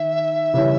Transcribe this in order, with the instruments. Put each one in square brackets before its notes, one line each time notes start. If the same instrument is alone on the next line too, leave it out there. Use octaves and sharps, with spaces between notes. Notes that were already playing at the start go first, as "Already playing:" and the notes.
Already playing: [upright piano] D#3 [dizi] E5
[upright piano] C#3 E3 G3 C#4 E4